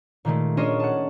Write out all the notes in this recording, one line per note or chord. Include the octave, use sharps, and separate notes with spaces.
A#2 D#3 G#3 A3
C#4 D4 F4 G#4 C#5 D#5
F#5 A5